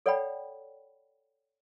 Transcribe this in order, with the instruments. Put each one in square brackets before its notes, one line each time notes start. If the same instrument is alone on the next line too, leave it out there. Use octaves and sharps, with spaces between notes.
[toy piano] A4 C#5 D5 F#5 G5 B5